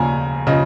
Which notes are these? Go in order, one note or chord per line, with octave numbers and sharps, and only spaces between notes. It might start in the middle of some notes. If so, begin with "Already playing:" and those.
Already playing: D#2 C#3 F3 G#5 A#5
C#3 F3 D#5